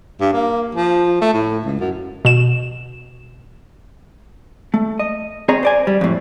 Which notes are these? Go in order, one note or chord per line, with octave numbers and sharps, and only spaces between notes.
G2
A#3
F3
A3
A2
C#2
F#2
B2 E7
A3
D#5
C4 G#4 C#5 D#5 A#5
C5 D5 G#5
G3
F2 A2